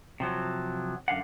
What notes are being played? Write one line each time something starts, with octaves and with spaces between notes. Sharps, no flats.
C3 F3 F#3
F#2 D3 F5 F#5